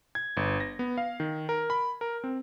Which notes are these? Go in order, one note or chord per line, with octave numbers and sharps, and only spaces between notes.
G#6
G1
A#6
B3
F5
D#3
A#4
B5
A#4
C4